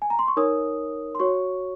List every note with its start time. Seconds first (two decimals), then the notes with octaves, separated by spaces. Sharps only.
0.02 G#5
0.10 A#5
0.19 C6
0.28 C#6
0.37 D#4 A#4 C#5 D#6
1.15 C6
1.20 F#4 C#5 C#6